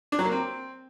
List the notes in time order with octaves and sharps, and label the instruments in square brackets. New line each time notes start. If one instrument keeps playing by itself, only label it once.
[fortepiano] D4
F#3
A#3
C4